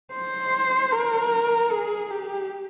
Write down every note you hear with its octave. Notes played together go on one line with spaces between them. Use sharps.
C5
A#4
G#4
G4